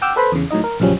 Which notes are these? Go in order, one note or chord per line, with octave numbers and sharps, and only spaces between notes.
F#5 G5 D6 E6 F6 G6
A4 B4 C5 B5
E2 C#3
A2 F#3 D#4 D#5
A#4
A#1 F#2 C#3 F3 G3 C#4